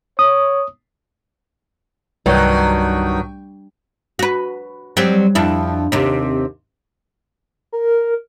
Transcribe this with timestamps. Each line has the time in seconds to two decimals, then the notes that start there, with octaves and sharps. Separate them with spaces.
0.19 C#5 D#6
2.26 C2 G2 D#3 F#3 C#6 G6
4.19 F#4 B4
4.97 F#3 G3 C4
5.35 F2 D4 E4
5.92 D#2 C3
7.73 A#4